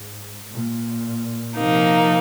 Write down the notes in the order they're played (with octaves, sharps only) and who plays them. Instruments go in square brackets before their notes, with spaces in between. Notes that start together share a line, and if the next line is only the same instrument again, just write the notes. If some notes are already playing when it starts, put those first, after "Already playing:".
Already playing: [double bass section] G#2
A#2
[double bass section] C3 [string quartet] F3 A#3 D#4